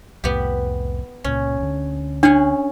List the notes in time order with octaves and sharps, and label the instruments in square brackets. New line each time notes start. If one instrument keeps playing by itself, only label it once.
[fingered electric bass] C2 F2 A2 [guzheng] B3 G4
[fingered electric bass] C#2 A#2 [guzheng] C#4
[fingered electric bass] D2 D3
[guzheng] C#4 G#4 F#5 [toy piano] D4